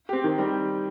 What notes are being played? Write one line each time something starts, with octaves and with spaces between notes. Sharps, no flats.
C4 G4
D#3
G3 C4 G4